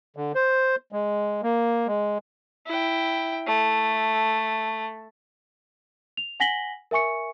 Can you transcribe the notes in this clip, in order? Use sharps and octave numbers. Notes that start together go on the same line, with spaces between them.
D3
C5
G#3
A#3
G#3
E4 G5
A3
F7
F#5 G#5 A#6 B6 F#7 G7
A#4 E5 G#5 C#6 C#7